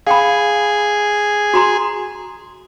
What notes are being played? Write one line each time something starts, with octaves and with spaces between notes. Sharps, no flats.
G#4 F5 G5 B5
F#4 A#5 C6